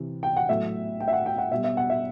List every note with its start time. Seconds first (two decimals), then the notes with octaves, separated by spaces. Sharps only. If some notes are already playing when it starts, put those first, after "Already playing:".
Already playing: C3 E3
0.23 G5
0.36 F#5
0.49 A2 F#3 A3 E5
1.00 G5
1.08 E5
1.13 F#5
1.26 G5
1.38 F#5
1.51 B2 G3 E5
1.64 E5
1.77 F#5
1.90 E5